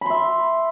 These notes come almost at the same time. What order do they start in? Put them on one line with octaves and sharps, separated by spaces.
B5 C6 E5